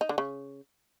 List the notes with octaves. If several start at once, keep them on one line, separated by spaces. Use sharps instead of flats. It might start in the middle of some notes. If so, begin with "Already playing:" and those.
D#4
D3
C#3